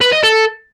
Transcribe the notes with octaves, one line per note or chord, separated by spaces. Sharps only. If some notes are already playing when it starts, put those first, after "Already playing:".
B4
D#5
A4